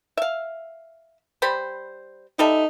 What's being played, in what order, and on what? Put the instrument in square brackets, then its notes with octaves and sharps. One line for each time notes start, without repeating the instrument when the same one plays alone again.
[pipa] E5 F5
G3 C5 B5
[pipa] G3 A4 E5 [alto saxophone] D#4